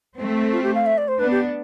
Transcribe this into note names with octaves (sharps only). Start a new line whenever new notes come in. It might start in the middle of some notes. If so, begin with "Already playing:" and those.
A3 C4
F4
G4
F5
E5
D5
C5
B3 D4 B4
G4